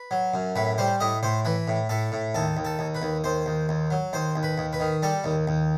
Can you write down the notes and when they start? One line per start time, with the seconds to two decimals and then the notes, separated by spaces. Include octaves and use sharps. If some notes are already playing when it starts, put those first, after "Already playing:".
Already playing: B4
0.11 F#3
0.34 F#2
0.56 A2 B4
0.78 G3 C5
1.00 A2 D#5
1.23 A2 C5
1.45 E3 B4
1.68 A2
1.89 A2 A4
2.12 A2
2.35 D#2 A4
2.57 D#2
2.65 A4
2.79 D#2
2.95 B4
3.02 D#2
3.24 D#2 C5
3.46 D#2
3.69 D#2
3.91 F#3
4.13 D#2 C5
4.36 D#2
4.43 B4
4.58 D#2
4.73 B4
4.80 D#3
5.03 G3 A4
5.24 D#2
5.48 D#2